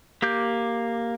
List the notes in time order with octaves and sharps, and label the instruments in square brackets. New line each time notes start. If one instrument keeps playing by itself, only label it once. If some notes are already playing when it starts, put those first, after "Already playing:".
[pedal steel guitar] A#3 G4 D6 G6